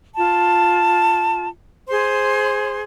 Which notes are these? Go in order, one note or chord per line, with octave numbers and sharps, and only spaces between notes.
F4 A5
G#4 C5 C6